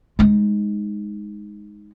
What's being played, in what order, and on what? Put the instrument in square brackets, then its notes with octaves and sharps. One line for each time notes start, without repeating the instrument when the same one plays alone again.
[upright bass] G#3 D#4